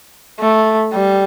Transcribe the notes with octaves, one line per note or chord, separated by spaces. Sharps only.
A3
G3